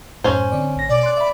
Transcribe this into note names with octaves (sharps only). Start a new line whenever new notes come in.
F#2 A2 C#4 C5
D3 C4 D5
A1 A#6
B2 D5
C6 F#6
E5 B5